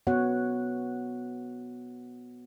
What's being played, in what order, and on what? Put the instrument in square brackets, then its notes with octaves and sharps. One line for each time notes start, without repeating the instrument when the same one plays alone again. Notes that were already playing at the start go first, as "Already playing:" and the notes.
[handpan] B3 F#4 C#5 F#5